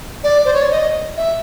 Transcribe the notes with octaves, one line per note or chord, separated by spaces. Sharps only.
D5
C5
C#5
D5
D#5
E5